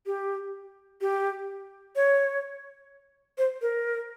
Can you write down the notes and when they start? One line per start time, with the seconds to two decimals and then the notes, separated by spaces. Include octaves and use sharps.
0.06 G4
1.01 G4
1.96 C#5
3.38 C5
3.62 A#4